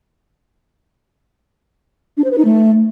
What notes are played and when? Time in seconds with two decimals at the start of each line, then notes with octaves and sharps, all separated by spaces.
2.17 D4
2.24 C5
2.31 B4
2.38 D#4
2.45 A3